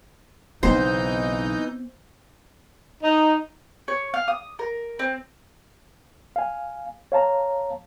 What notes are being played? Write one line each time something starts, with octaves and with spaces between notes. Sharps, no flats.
B1 C#3 E3 B3 C4 D#4 C5 G6
D#4
C#5
F5
D#6
A#4
C4
F5 G#5
C#5 F5 A5 A#5